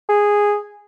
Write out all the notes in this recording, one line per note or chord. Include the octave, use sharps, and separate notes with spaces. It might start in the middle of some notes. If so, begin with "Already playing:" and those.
G#4